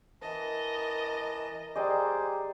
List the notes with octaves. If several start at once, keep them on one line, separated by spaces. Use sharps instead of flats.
E3 A#4 D#5 A5
G3 G#4 C5 D5 D#5 G5 A#5